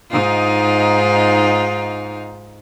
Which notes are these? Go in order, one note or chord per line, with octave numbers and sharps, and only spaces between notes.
G#2 D#4 F4